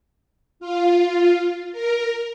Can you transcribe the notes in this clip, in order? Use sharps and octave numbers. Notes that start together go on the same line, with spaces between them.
F4
F4
A#4